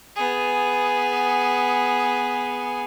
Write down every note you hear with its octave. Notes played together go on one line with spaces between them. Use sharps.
B3 G#4